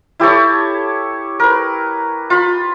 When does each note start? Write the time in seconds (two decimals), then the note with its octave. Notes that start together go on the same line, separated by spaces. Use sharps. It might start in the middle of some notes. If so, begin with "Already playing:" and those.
0.20 E4 G4 A4 C#5
1.40 A#4 B4
2.30 F4 B5